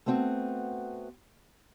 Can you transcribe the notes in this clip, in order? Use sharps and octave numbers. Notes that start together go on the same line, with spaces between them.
A3 B3 C4 F#4